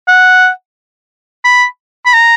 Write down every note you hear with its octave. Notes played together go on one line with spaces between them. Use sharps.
F#5
B5
B5
A#5